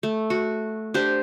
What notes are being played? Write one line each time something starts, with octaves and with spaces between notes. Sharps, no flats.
A3
F#4
D4 G4 C5